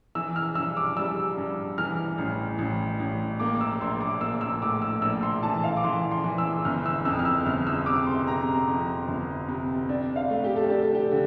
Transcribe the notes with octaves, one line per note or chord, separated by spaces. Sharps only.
E3 E6
F6
G2 E6
D6
G3 E6
G2
E3 F6
A1
A1
A1
A#3 D6
D6
E6
A#1 C6
D6
A#3 E6
E6
A2 D6
E6
A#1 E6
C6
E3 A5
F5
D6
E3 C6
C6
E3
E6
G1 F6
E6
F2 E6
F6
E6
G1 F6
E6
C3 D6
C6
C3 A#5
F2
G1
C3
D4
F5
A3
G4
A4
D4 G4
A4
G4
D3